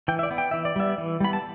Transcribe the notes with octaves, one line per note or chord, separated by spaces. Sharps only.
E3 G5
E5
D5
B3
G5
E3 E5
D5
G3 B3 E5
E3
G3 B3 B5
A5